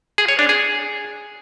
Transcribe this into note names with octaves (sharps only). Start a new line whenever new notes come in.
G#4
C#5
D4
G#4